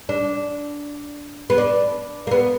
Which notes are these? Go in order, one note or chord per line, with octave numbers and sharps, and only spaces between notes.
D4
B3
D4
A#3
B3